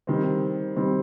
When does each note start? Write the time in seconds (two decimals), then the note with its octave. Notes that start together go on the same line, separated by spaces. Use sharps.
0.07 D#3 G3 C4
0.76 D#3 G3 C4